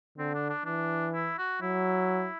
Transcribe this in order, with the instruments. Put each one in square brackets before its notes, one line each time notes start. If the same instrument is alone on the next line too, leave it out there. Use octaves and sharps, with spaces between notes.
[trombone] D3 [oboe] C4
[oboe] D4
D4
[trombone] E3 [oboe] D4
[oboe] E4
F#4
[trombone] F#3 [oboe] E4